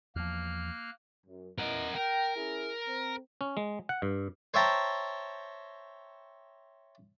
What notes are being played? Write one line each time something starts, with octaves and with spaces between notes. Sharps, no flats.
E2 F3 A#3 F6 F#6
F#2
B3 E4 A#4 D#5 F#5
A#4 G5
C#4 E4 G#4
C4
C#4
G#3
F#5
G2
C5 C#5 E5 G5 A5 A#5